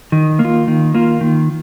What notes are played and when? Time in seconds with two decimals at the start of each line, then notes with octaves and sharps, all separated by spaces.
0.12 D#3
0.39 A#3
0.45 F4
0.68 D#3
0.94 A#3 F4
1.21 D#3